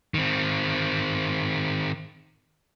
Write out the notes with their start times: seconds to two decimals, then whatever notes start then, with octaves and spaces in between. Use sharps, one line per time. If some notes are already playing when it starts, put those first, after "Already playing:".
0.14 D#3 C4